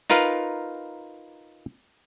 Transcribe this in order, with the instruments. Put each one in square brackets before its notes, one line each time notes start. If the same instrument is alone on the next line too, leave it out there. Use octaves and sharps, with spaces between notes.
[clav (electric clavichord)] D#4 F4 A#4 B4 F5